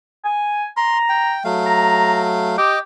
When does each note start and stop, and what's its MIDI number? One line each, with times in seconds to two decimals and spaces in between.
0.25 0.66 80
0.77 1.35 82
0.77 0.98 84
1.09 1.43 79
1.44 2.56 54
1.44 2.56 57
1.44 2.56 77
1.66 2.23 82
2.58 2.77 67
2.58 2.79 75
2.58 2.79 86